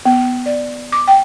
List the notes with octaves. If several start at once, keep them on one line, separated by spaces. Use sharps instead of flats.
B3
D5
D6
G5